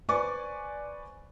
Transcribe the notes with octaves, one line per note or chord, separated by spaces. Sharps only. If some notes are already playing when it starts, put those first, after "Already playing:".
B4 C5 D5 G#5 C#6 D6